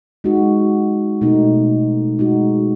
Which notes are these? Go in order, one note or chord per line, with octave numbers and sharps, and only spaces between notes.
G#3 D#4 F#4
B2 A3 D#4
G#3 D#4 F#4